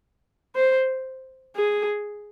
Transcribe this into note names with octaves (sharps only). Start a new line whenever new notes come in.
C5
G#4